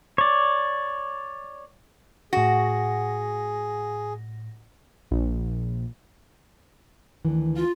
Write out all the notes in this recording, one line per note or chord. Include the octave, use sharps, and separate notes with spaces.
C#5 D5
A2 F#4 G#4 A#6
A#1
D2 D#3 E3
F4 F5